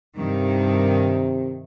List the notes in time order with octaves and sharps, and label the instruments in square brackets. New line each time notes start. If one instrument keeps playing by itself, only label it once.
[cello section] G2 D#3 [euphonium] C3